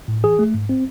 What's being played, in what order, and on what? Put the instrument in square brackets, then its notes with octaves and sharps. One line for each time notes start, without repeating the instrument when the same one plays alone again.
[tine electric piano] A2
E3 G#4
A3
G#2
C4